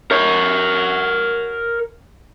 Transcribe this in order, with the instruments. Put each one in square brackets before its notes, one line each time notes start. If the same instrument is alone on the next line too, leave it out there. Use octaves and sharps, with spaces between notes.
[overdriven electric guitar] A#4 C#5